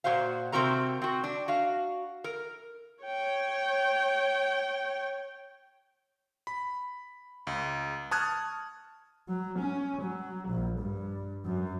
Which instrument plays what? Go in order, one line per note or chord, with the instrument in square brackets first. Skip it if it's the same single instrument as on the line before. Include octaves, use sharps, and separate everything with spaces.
[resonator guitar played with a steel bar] A#2 F#4 C5 F5
C3 C4 F#4 A#4 A#5
C4 F#4
D4
F#4 F5
A#4
[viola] C#5 G5
[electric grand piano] B5
C#2
A5 C#6 D#6 F6 F#6 G#6
[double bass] F#3
C#4
F#3
A#1
G2
F#2